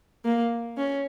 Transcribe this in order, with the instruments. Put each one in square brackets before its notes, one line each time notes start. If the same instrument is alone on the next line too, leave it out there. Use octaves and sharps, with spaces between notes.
[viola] A#3
C#4